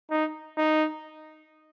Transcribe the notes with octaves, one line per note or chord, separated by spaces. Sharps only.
D#4
D#4